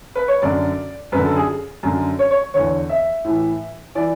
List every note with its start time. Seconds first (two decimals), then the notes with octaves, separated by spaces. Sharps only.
0.16 B4
0.28 C#5
0.42 F#2 D3 D5
1.12 F#2 B4
1.17 D3
1.25 A4
1.36 G#4
1.83 F#2 D3
2.19 C#5
2.31 C#5
2.54 E2 D3 C#5
2.89 E5
3.25 A2 E3
3.95 E3 D5